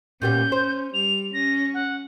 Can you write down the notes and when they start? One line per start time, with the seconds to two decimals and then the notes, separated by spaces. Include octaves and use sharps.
0.22 A#2 G3 B3 C#4 G6
0.52 C5
0.94 G3 F7
1.34 C#4 A#6
1.74 F#5